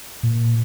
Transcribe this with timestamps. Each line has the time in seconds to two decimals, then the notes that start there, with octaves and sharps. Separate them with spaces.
0.23 A#2